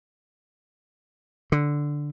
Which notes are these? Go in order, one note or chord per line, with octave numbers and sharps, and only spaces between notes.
D3